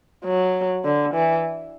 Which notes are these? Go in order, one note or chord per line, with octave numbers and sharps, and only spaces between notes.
F#3
D3
E3